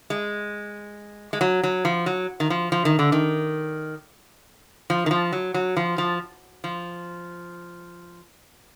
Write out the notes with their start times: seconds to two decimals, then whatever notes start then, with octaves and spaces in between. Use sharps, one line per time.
0.10 G#3
1.33 G#3
1.41 F#3
1.63 F#3
1.85 F3
2.06 F#3
2.40 D#3
2.50 F3
2.72 F3
2.85 D#3
2.99 D3
3.12 D#3
4.90 F3
5.06 D#3
5.11 F3
5.32 F#3
5.54 F#3
5.76 F3
5.98 F3
6.64 F3